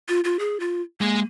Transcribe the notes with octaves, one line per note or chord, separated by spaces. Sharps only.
F4
F4
G#4
F4
G#3 A#3